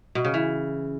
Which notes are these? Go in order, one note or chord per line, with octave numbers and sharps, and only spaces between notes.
B2
C#3
E3